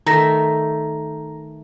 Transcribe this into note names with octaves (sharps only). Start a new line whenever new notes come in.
D#3 A3 E5 A#5 A#6